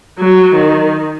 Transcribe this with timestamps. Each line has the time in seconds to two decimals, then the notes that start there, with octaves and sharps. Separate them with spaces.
0.18 F#3
0.55 D#3